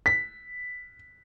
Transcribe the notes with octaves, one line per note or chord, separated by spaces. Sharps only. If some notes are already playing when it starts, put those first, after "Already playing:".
B6